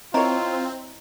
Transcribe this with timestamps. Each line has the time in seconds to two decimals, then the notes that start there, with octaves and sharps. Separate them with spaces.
0.14 C4 E4 F4 A#4 C#5 D#5 A#5